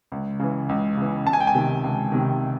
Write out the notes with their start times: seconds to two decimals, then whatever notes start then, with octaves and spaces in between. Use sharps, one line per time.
0.12 C#2
0.39 C#3 E3
0.69 C#2
0.97 C#3 E3
1.25 C#2 A5
1.33 G#5
1.40 G5
1.47 G#5
1.55 C3 D#3
1.84 C#2
2.12 C3 D#3